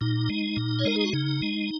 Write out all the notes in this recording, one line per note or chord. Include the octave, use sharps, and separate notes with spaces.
A#2 D#4
G#3
A#2
C#5
G#3 A#4
G#4
F#4
C#3 D#4
G#3